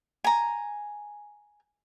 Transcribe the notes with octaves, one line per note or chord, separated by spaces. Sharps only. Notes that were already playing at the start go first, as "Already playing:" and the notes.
G#5 A#5